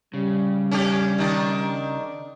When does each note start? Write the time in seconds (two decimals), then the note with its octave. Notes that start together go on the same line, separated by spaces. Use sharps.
0.14 C#3 G3
0.71 C#4 D4 G4
1.18 D#3 D4